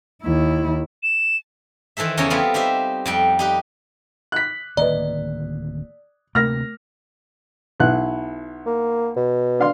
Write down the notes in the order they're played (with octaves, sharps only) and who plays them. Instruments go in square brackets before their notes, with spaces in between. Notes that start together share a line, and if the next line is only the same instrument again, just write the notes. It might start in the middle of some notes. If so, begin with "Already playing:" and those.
[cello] D#2 E4
[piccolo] E7
[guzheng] D#3 E3 A4 C5 E5
E2 C#3 C#4 A4 A#5
G3 B3 C4 F4
D#4 G4 C5 E5
F2 G3 G5
D#4 G4 B4
[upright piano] F#6 B6
[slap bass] D1 D#3 A#3 [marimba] B4 D#5 A#5 [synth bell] D5
[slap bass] D2 C3 A#3 [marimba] A3 A#4 [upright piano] F6 A#6
[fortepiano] B1 E4 F#6
[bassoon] A#3
B2
[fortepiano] D4 F5 C6